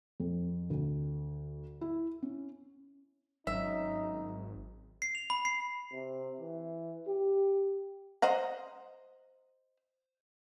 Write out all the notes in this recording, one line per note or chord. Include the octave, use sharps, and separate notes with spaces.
F2
D2
E4
C#4
G#1 F#3 C#4 D#4 E5
C7
F7
B5
C7
C3
E3
G4
C5 D#5 F#5 A#5